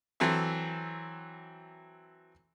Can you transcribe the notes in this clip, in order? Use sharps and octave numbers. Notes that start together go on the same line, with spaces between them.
E3 F#3 C4 A4 E5